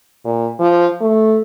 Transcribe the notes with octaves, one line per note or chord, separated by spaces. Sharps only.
A#2
F3
A3